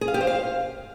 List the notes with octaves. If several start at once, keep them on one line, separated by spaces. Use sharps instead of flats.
G#4
F5
G4
C5
F5